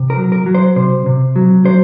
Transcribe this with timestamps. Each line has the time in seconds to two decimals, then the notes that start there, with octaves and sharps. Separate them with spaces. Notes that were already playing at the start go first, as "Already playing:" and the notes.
Already playing: C3
0.10 A#4
0.16 F#3
0.32 A#4
0.46 F#3
0.55 C5
0.76 C3 C5
1.06 C3
1.36 F#3
1.66 F#3 C5